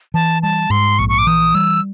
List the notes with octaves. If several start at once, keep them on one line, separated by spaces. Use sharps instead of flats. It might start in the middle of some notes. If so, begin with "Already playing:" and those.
E3 A5
G3 A5
G#2 C6
A#1 C#6
C#6
D6
E3 D#6
G3 E6